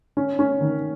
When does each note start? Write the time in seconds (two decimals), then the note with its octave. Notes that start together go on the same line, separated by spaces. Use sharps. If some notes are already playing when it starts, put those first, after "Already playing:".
0.17 C#4
0.39 C#4
0.61 D#3